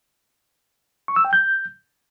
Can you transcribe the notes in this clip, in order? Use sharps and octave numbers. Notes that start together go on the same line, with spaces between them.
C#6
E6
G5
G6